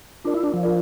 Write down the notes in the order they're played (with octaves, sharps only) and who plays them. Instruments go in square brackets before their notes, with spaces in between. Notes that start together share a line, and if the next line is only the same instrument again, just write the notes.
[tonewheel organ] D4 [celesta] F4 A#4 D5
[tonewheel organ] E4
D4
F3
[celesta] F4 A#4 D5